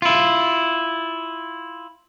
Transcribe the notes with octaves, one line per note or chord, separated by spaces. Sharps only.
E4 F4